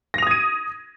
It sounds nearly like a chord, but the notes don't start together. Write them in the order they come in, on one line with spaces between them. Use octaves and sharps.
A#6 F7 D#6 G#6 D#7